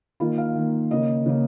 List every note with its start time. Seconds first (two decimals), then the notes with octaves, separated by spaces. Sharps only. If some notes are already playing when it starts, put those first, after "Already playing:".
0.20 D#3 A#3 F4
0.38 F5
0.56 D#3 A#3
0.90 C#3 A#3 D#5
1.26 C#3 A#3